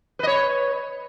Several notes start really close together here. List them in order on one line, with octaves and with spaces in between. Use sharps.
B4 D#5 C#5